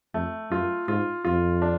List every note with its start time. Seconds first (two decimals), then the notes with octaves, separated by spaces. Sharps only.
0.14 F2 A3
0.50 F#2 F4
0.88 G#2 F4
1.25 F2 F4
1.62 D4